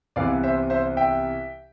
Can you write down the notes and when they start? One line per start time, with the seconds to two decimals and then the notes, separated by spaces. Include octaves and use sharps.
0.16 C2 C3 E3 B3 E4 D5 F5
0.43 C5 E5
0.70 C5 E5
0.97 E5 G5